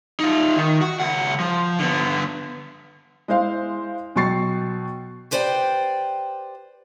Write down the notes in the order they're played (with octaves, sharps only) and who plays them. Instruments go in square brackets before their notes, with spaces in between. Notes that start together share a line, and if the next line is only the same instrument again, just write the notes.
[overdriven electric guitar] D#4 F4
D#3
F#4
C#2 F#5
F3
D3 B3
[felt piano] G#3 E4 C5 F5
B2 F#3 G5 C#6 A6 C7
[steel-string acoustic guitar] G4 B4 C5 D5 E5 G5